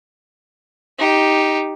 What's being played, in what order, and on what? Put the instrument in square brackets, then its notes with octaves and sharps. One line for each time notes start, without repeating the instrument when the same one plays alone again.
[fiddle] D#4 G4